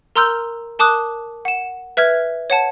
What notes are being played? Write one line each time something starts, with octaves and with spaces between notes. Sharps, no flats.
A#4 A#5 C6 E6 F6 G6
A#4 A5 D6 D#6 F#6
F#5 E7
B4 E5 F6 G#6
C#5 F#5 A5